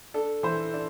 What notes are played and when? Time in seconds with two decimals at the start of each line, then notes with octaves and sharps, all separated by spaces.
0.14 D4 A4
0.43 E3 C5
0.74 D4